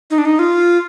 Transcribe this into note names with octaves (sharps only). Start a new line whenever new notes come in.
D#4
D4
D#4
F4